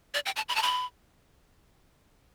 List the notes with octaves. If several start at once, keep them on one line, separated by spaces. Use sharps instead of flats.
D5
G5
A5
B5
A5
B5